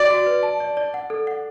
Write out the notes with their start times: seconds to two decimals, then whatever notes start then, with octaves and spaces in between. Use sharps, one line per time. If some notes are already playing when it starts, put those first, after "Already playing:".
Already playing: F#4 D5
0.10 F#4
0.26 B4
0.43 A5
0.60 D5
0.77 D5
0.94 F#5
1.10 A4
1.27 F#5